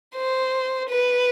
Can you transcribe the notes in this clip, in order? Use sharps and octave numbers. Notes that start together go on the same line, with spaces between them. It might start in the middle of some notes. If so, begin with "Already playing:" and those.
C5
B4